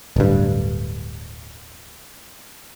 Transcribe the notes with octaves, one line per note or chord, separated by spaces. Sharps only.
D1 G2